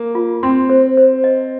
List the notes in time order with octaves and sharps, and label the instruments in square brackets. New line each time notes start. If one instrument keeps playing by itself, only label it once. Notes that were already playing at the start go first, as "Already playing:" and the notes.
Already playing: [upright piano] A#3
[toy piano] F4
[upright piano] C4 [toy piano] C6
[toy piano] C5
C5
D#5